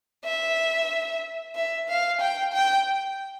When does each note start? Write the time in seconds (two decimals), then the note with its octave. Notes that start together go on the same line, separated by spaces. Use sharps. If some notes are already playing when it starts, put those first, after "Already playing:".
0.24 E5
1.55 E5
1.89 F5
2.20 G5
2.53 G5